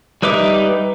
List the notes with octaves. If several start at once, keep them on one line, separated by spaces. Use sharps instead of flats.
G3 D#4 B4 E5 D6